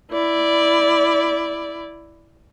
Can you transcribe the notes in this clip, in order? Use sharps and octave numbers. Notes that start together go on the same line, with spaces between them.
E4 D5